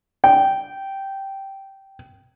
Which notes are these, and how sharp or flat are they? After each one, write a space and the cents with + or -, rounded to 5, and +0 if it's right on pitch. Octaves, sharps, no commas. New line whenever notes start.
G5 -10